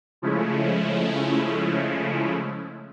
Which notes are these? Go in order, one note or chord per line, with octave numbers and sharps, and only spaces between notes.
C#3 F3 G#3 A3 C#4 E4